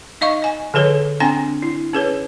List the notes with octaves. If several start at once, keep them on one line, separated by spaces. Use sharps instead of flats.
D#4 D#5 F5 C#6
D#5 G#5
D3 F3 G#4 B4 C#5
C4 D4 G5 G#5 C6
E4
C#4 G#4 B4 C#5